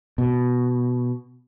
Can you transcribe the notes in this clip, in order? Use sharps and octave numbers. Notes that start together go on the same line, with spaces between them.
B2